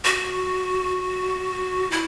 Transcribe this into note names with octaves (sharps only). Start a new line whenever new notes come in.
F#4
E4